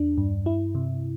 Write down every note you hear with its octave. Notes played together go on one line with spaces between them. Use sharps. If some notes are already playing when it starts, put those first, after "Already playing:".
Already playing: E2 D4
G2
E4
C3